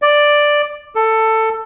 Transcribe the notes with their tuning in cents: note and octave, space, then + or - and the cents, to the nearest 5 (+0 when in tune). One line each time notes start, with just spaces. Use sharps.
D5 +5
A4 +15